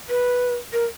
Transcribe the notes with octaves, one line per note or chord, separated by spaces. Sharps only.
B4
A#4